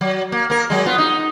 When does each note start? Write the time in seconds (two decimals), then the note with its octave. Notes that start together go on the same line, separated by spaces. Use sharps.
0.01 F#3
0.32 A#3
0.50 A#3 A#4
0.70 F#3 G#3
0.86 B3 F4
0.98 D#4